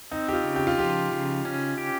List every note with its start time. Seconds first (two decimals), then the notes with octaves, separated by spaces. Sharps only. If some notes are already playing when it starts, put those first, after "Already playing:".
0.11 C4 D#4
0.28 G4
0.33 F4
0.44 C#3
0.56 G4
0.67 F4
0.77 F3 G4
1.12 C#3
1.45 C#4
1.78 G4